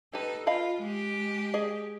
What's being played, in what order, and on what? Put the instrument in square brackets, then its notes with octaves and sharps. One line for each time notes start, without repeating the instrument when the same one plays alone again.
[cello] D#4 A4 [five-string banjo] G4 B4
[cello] F4 [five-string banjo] D#5 F5 B5
[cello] G#3 G4
[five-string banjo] G#4 D#5